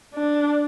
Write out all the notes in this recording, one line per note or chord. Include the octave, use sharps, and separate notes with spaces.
D4